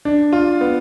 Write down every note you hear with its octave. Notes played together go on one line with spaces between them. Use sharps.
D4
F4
B3